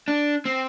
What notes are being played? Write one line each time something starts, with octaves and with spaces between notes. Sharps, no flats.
D4
C4